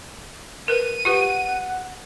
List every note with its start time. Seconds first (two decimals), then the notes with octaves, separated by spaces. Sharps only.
0.68 A#4 B4 D#7
1.05 F4 G4 B4 F#5